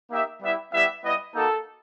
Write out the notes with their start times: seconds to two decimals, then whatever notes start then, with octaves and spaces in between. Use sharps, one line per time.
0.11 A#3 D#4 G4 E5
0.42 G3 B3 E4 G4 E5
0.72 G3 B3 E4 G4 E5
1.03 G3 B3 E4 D#5
1.34 A#3 D#4 F#4 A4